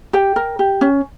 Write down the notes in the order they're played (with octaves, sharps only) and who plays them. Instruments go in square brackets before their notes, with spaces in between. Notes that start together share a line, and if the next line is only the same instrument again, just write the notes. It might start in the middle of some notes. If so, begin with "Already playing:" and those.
[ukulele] G4 G5
A#4
G4
C#4